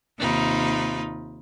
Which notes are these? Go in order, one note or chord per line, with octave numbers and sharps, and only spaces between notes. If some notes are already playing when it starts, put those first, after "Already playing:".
D#2 C3 D#4 F4 B5